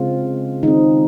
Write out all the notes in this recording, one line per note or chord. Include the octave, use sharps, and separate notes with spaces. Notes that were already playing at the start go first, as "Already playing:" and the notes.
Already playing: C#3 G#3 C4 F4
D#3 G#3 C4 D#4